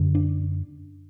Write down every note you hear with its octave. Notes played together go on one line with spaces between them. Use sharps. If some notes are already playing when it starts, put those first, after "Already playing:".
Already playing: F#2 D3
D4